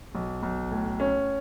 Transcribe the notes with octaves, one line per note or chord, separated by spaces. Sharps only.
B1
B1
A2
C#4